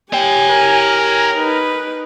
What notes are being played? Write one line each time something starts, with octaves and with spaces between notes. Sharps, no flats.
G4 C#5 G5 G#5
A#4
D#4 B4